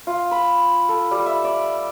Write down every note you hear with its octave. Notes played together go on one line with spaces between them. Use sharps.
F4
B5
A4
G3
E5
D5